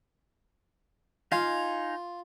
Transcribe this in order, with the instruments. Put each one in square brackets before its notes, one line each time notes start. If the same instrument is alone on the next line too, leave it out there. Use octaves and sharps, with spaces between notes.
[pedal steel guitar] D#4 F5 G#5 [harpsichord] F4